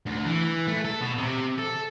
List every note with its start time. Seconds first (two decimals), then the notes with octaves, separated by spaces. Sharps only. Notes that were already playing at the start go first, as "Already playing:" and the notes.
0.07 D2
0.26 E3
0.68 A3
0.85 A4
1.01 B2
1.18 C3
1.59 A4